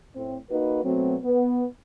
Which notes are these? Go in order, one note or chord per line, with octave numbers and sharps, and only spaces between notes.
A2 C4
A#3 D#4 F#4 B4
B2 F#3 A3 C4
B3